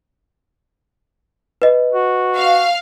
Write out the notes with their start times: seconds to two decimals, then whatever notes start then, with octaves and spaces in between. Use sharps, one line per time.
1.62 B4 D#5
1.93 F#4
2.36 F5